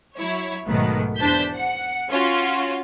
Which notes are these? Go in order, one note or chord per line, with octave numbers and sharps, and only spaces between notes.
F#3 E4 C#5
B1 G#2 B2 D#3 A3 B3
E2 D4 C5 A5 G6 B6
F#5 C#7
C#4 F4 F#4